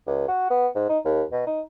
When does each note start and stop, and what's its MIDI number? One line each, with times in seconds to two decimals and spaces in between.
0.07 0.27 37
0.28 0.48 66
0.50 0.67 59
0.75 0.87 44
0.89 0.98 63
1.05 1.23 39
1.32 1.44 47
1.47 1.61 63